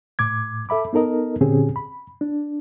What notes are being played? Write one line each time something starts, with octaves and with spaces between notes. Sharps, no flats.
A2 D6 G#6
A4 E5 B5 D6
B3 D#4 A4 A#4 D#5
A#2 D3 C4 C#4 G4 G#4
B5
D4